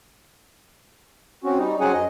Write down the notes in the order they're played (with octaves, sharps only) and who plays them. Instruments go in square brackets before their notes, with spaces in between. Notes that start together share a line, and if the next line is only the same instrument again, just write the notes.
[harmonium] C4 C#4 F#4
G3 D#4
F#3 C4 C#4 G#4 F#5 G#5
F#2 D#5